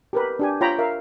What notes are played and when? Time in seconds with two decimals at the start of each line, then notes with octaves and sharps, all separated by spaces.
0.13 G4 A#4 B4
0.39 D4 G4 G#5
0.61 F4 C#5 G5 A#5 B5
0.78 A#4 E5 F5